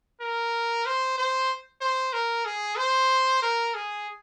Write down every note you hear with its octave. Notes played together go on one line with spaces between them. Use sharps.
A#4
C5
C5
C5
A#4
G#4
C5
A#4
G#4